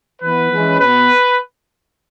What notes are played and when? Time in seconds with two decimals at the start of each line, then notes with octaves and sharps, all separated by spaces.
0.22 E3 B3 B4
0.51 E3 G#3 C#4
0.79 B2 B3 B4